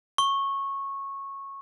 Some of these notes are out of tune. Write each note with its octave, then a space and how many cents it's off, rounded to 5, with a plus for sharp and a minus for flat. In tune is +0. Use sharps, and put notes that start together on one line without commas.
C#6 -15